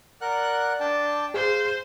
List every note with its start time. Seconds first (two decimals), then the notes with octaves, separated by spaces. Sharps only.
0.21 A#4 D5 F#5 F#6
0.80 D4 G5 A5
1.34 G#4 C5 F5